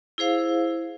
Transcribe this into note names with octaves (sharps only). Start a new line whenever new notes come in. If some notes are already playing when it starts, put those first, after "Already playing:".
E4 G#4 C5 F5